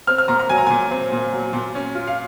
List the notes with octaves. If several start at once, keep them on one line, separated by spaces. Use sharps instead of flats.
C4 F6
F6
A#2 A#5
A#5
F#3 G#5
A#5
A#2 G#5
C4
A#2
F#3
A#2
C#4
F4
F5